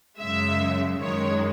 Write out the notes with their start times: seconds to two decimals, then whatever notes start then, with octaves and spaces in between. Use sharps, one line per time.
0.18 F#2 C#3 G#3 E5
0.99 F#2 D#3 G#3 C#5